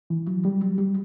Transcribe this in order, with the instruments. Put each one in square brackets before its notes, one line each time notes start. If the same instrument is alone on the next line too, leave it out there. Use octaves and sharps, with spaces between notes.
[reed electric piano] E3
F#3
G3
F#3
G3